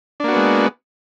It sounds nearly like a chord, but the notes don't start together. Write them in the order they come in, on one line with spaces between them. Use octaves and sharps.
D4 A#3 F#4 B3 G#3